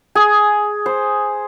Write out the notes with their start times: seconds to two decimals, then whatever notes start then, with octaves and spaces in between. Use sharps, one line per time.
0.15 G#4
0.86 C5